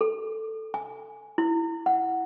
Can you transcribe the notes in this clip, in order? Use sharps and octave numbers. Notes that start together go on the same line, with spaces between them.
A4
G#5
E4
F#5